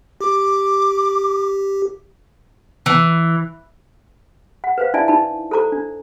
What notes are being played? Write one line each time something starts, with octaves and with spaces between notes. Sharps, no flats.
G4 D6
E3
F#5
B4 C5 F5
D4 E4 D5 E5 G#5 A5
D#4 E4 A5
A4 C5 A#5 D6
D4